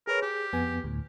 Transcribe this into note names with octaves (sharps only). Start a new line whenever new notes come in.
G#4 A#4 B4 C#5
G4 G#4
F2 B3 G#5
D2 A2